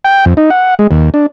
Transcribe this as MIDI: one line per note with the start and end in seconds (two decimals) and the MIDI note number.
0.05 0.25 79
0.25 0.34 41
0.37 0.50 63
0.50 0.75 78
0.79 0.87 56
0.91 1.10 39
1.14 1.26 62